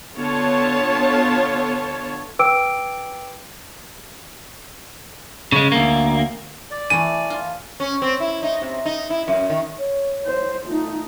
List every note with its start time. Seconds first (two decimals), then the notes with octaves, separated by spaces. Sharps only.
0.17 D3 B3 F4 C#5 A5
2.39 B4 G5 D6 E6 D7
5.52 C#3 G#3
5.72 D2 A#3
6.71 D5
6.90 E3 A3 D#7
7.30 F4
7.80 C#4
8.02 C4
8.20 E4
8.43 D#4
8.62 C3
8.85 D#4
9.10 E4
9.28 F#2
9.50 D#3
9.78 C#5
10.25 C5
10.67 A3 D#4 F4